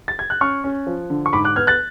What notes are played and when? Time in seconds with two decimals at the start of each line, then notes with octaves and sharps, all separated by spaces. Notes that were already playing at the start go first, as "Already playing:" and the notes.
0.08 A6
0.19 G#6
0.30 F#6
0.41 C#4 C#6 F6
0.64 C#4
0.87 F3
1.10 D3
1.26 C#6
1.33 G#2 B5 D6
1.45 D6 F#6
1.56 B3 F6 G#6
1.67 F#6 A6